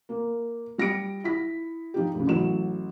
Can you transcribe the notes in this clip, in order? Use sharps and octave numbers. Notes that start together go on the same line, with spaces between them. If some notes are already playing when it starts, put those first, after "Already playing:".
A#3
G3 A#6 C#7 D7
E4 B6
F3 D#4 G4
D2 C#3
A1 F#3 E7